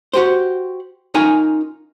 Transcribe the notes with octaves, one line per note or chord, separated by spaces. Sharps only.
F#4 G4 C5
C#4 D#4 F4 A#4 G5 G#5